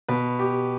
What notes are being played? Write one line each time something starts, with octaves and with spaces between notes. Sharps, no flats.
B2 B4
G4